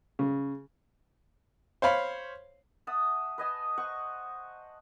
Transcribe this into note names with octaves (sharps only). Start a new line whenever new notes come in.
C#3
C5 C#5 F5 B5
E5 F#5 A5 D#6
B4 D#5 G#5 A5
C5 F#5 C#6